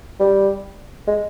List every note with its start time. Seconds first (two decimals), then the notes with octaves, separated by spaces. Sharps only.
0.20 G3
1.07 G#3